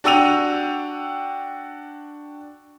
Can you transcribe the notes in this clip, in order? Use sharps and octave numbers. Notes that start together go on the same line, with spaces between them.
D4 F#4 G5 E6 D#7 F7